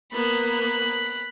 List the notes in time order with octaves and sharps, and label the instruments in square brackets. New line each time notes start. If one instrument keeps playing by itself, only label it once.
[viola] A#3 B3 [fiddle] B5 F#6